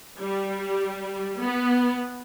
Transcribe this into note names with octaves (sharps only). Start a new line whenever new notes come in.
G3
B3